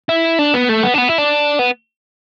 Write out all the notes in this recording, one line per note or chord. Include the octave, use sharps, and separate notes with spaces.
E4
D4
B3
A3
B3
D4
B3
E4
D4
B3